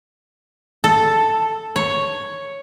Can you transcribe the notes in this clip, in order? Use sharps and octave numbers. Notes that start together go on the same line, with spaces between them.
A4
C#5